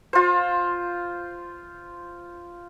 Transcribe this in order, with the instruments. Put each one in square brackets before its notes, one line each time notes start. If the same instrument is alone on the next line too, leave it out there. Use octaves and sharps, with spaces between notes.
[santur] F4 C5